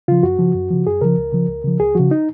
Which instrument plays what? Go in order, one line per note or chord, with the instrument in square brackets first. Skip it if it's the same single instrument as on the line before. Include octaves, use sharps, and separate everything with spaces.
[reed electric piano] C#3 F3 F4
F#2 F#4
C#3 F3
F#2
C#3 F3
F#2 G#4
C#3 F3 A#4
C#2
C#3 F3
C#2
C#3 F3
C#2 G#4
C#3 F3 F#4
D#4